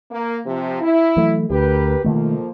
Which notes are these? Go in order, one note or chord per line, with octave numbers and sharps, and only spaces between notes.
A#3
C3 F3
E4
E3 F#3 A3
D2 G4 A#4 B4
F2 B2 D#3 F3 A3 A#3